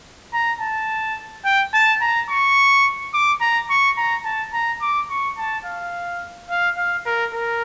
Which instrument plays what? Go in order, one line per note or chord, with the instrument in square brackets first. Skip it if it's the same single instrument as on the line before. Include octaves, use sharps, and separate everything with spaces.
[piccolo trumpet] A#5
A5
G5
A5
A#5
C#6
D6
A#5
C#6
A#5
A5
A#5
D6
C#6
A5
F5
F5
F5
A#4
A#4